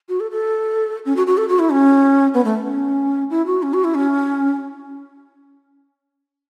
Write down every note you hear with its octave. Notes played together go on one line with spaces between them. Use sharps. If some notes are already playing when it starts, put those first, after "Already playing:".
F#4
A4
A4
C#4
F#4
F#4
A4
F#4
E4
C#4
B3
A3
C#4
E4
F#4
C#4
F#4
E4
C#4